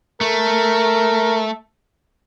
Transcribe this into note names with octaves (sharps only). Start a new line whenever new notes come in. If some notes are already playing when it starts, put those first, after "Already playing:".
A3 A#4